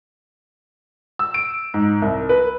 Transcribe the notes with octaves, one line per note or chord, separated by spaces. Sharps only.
E6
D7
G#2
C2
B4